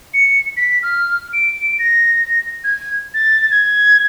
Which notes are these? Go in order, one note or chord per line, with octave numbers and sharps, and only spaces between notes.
C#7
B6
F6
D7
A#6
G#6
A6
G#6